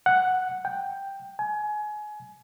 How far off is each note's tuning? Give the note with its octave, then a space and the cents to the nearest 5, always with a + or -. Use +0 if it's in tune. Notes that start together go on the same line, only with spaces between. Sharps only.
F#5 +0
G5 +5
G#5 +25